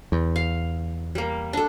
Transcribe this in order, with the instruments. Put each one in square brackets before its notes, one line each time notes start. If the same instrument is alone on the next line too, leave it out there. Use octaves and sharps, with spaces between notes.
[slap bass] E2
[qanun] F5
G3 A#3
D4 A4